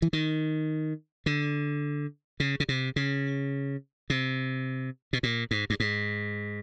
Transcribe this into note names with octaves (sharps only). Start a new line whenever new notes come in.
E3
D#3
D3
C#3
C#3
C3
C#3
C3
B2
A#2
G#2
G2
G#2